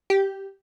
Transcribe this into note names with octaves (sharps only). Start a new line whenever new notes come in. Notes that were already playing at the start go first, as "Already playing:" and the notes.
G4